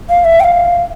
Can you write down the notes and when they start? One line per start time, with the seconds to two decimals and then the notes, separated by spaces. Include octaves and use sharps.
0.09 F5
0.25 E5
0.40 G5
0.44 F5